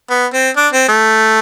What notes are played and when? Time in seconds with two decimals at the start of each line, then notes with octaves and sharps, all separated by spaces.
0.10 B3
0.33 C4
0.57 D4
0.73 C4
0.88 A3